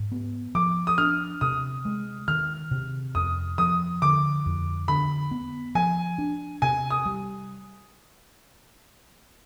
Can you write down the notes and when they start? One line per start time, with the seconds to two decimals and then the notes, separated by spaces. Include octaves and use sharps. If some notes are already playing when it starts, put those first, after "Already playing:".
Already playing: G#2
0.12 B3
0.55 F3 D6
0.87 D#6
0.98 D4 F6
1.41 C3 D#6
1.85 G#3
2.28 D#3 F6
2.71 C3
3.15 F2 D#6
3.58 F3 D#6
4.02 D3 D6
4.46 F2
4.88 D3 B5
5.31 B3
5.75 F3 G#5
6.18 D4
6.62 C3 G#5
6.90 D#6
7.06 G3